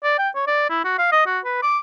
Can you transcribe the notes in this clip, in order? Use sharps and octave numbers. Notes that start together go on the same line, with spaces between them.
D5
G5
C#5
D5
E4
F#4
F5
D#5
F#4
B4
D6